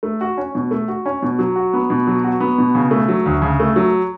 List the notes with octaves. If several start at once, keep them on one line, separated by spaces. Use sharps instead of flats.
A3
F#4
C#4
B2
A3
F#4
C#4
B2
F#3
F#4
B3
B2
F#3
F#4
B3
B2
C#3
A3
F#3
D2
C#3
A3
F#3